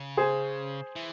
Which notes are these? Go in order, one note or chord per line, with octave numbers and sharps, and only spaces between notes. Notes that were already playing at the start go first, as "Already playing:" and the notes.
Already playing: C#3
G#4 C5
E3